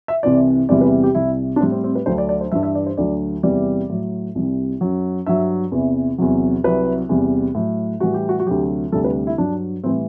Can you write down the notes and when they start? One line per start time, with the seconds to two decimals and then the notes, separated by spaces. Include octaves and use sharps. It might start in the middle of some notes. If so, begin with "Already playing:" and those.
0.08 E5
0.23 C2 C3 E3 D5
0.69 E2 C3 E3 G3 D5
0.81 B4
1.04 G4
1.15 C2 C3 G3 E4
1.56 D4
1.60 A2 G3 C4
1.72 C4
1.84 C4
1.95 B4
2.06 D2 D3 F#3 C5
2.18 D5
2.29 D5
2.41 C5
2.52 G2 E3 G3 E5
2.63 E5
2.75 D5
2.87 C5
2.97 D2 D3 F#3 D5
3.43 E2 C3 E3 G3 D5
3.90 A2 F#3
4.35 C2 C3 G3
4.81 F#2 F#3
5.26 G2 F#3 E5
5.72 E2 C3 E3
6.18 E2 C3 F#3
6.64 C2 C3 F#3 B4
7.09 E2 C3 G3
7.55 A2 F#3
8.00 A2 E3 G3 F#4
8.14 G4
8.29 F#4
8.40 F#4
8.46 D2 C3 F#3 G4
8.92 D2 C3 G3 A4
9.04 B4
9.27 E4
9.38 G2 F#3 D4
9.84 A2 E3 G3 C4